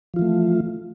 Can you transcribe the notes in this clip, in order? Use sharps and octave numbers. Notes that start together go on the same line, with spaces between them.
E3 F3 A3 F4